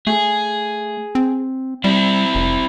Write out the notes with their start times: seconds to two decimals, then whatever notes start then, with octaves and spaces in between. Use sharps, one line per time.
0.07 A3 G#4
1.15 C4
1.84 G3 C4 E4
2.35 F1